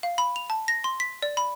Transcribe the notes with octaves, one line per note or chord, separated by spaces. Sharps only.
F5
B5
F7
A5
A#6
C6
B6
D5
B5